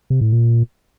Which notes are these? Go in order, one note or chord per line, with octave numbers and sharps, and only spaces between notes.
C3
A2
A#2